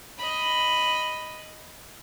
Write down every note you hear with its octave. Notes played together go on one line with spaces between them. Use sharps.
D#5 B5